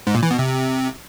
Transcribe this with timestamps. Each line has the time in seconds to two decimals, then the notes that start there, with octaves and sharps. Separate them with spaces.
0.07 G#2
0.15 A#2
0.23 E3
0.31 B2
0.39 C3